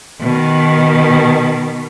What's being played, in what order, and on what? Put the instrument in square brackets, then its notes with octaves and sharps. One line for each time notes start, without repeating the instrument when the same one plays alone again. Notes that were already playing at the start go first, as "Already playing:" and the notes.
[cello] B2 D#3